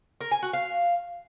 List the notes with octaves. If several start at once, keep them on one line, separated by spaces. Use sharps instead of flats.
A#4
G#5
F#4
F5